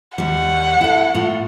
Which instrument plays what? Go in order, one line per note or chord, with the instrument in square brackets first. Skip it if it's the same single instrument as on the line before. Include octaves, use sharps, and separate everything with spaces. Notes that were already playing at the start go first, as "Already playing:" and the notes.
[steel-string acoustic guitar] D#2 G3 [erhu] F#5
[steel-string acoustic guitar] E4 A4
A2 F4